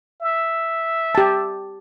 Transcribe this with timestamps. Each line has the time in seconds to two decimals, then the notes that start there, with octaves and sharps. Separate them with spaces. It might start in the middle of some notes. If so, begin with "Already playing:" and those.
0.21 E5
1.15 G4 A5